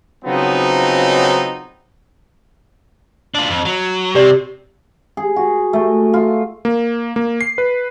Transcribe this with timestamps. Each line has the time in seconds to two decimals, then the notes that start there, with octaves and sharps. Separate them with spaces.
0.25 C#3 F3 F#3 B3 C4 D#4
3.35 D4 F4
3.50 F2
3.65 F#3
4.15 C3 G4 D5
5.17 G#4
5.36 F#4
5.73 A3
6.14 F4
6.65 A#3
7.16 A#3
7.41 C7
7.58 B4